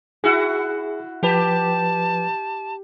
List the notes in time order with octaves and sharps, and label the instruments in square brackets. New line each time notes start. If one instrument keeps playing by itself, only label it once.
[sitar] E4 F#4 [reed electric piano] G#4
[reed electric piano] F3 B4 [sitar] G4 [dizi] A5